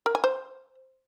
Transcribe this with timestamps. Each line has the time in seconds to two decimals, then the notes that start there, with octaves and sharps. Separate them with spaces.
0.06 A#4
0.15 G#5
0.24 C5